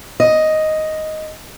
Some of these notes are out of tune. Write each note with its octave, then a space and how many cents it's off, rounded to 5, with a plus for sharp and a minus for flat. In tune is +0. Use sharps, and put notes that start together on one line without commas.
D#5 +5